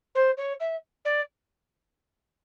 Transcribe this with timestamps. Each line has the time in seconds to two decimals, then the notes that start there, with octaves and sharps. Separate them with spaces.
0.15 C5
0.37 C#5
0.60 E5
1.04 D5